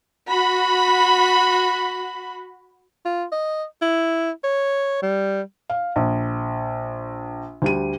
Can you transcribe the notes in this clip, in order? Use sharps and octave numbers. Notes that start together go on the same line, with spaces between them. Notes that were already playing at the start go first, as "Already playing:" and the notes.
F#4 B5
F4
D#5
E4
C#5
G3
F5
A#1
D2 G3 D#7